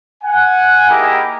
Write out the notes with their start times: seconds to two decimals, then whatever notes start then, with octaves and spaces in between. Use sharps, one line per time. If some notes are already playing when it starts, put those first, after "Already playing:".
0.23 F#5 G#5
0.89 A#3 D#4 E4 G4 G#4 A#4